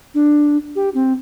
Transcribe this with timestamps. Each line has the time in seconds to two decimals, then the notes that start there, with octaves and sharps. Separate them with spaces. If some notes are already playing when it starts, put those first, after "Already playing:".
0.14 D4
0.75 G4
0.94 C4